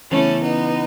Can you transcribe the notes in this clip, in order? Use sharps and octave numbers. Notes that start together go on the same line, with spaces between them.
C#3 E3 A3 B3 C#4 E4
B3 D#4